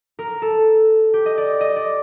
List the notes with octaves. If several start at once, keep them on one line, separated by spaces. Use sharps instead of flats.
A#4
A4
G4
D#5
D5
D#5
D5